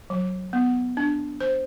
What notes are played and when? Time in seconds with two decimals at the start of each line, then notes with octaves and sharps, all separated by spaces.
0.10 F#3
0.53 B3
0.97 D4
1.41 C5